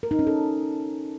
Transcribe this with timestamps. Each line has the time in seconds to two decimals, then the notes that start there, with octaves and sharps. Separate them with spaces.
0.03 A#4
0.11 D#4
0.19 C#4
0.27 A4